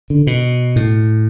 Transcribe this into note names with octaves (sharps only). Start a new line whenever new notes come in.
D3
B2
A2